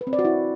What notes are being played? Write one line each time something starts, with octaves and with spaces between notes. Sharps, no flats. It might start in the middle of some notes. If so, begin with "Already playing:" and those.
B4
C4
D5
F#4
E4